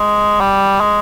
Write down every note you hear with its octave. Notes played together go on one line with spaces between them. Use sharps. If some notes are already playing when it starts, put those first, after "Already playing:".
Already playing: G#3
G3
G#3